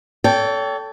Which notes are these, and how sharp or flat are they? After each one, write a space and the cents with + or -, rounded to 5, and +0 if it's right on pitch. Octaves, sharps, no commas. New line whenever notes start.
A4 +0 C#5 +40 G5 +0